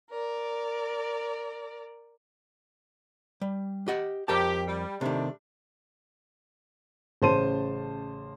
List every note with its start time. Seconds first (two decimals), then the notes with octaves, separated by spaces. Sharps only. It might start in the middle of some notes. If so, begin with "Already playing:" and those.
0.11 A#4 D5
3.41 G3
3.88 G4 D#5 F#5
4.28 F2 G4 A#4 A5
4.68 G3
5.01 C3 D#3 G3 A3 D4
7.22 A1 C#3 C5 A5 C6 D#7